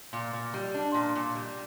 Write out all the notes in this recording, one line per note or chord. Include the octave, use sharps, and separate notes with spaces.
A#2
A#2
G3
D4
A#2
A#2
G3